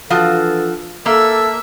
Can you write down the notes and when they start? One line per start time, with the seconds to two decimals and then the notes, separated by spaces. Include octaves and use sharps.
0.10 E3 F3 D4 F4 F#4 A4
1.06 A#3 A4 E5